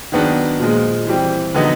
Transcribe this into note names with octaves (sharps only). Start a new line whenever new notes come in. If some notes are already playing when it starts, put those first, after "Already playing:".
D#3 F#3 B3 D4
A#2 F3 G#3
E3 G3 C4
D3 F#3 B3 D#4 F#4